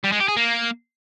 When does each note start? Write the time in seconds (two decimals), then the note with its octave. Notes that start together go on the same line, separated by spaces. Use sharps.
0.04 G3
0.12 G#3
0.20 G4
0.28 G#4
0.37 A#3